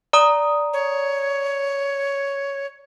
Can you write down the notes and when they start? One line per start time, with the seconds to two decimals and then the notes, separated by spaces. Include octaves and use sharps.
0.13 D5 A#5 D#6
0.73 C#5